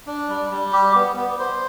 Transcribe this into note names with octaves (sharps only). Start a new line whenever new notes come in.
D4
G3
G3
G4
B3
B3
C5